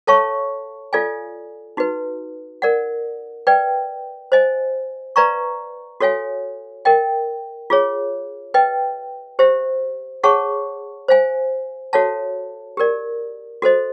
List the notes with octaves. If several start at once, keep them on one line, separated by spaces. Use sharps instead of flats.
A4 C#5 F5 A5 C#6
F4 A4 D5 F5 G#5
D#4 F#4 B4
A#4 D5 F#5
B4 D5 G5
C5 D#5 G#5
B4 D5 F5 A#5 C#6
F#4 A4 C#5 F5 G#5
A#4 D#5 G5
F4 G#4 C#5
B4 D#5 G5
G4 C5 E5
G#4 C#5 F#5 A5 C#6
C5 F5 G#5
F#4 A4 C#5 F5 A5
G4 A#4 D5
F#4 A4 C5 D#5